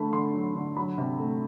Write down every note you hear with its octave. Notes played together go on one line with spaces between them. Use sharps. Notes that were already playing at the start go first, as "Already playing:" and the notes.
Already playing: D3 A3 A5 B5
D3 C6
F#3
D3
F#3 B5
C3
A3